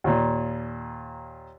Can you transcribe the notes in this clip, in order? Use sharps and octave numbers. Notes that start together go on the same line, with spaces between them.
D#2 A#2